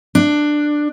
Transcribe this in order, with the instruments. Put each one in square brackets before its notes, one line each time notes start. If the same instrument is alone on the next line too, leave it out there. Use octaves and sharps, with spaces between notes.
[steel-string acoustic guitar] D4